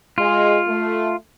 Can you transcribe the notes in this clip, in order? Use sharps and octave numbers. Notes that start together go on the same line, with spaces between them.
G#3 F4
A3